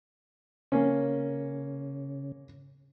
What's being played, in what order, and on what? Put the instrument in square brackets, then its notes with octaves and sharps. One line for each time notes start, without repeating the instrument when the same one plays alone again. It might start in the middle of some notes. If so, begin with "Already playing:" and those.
[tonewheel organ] C#3 [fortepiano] A#3 C#4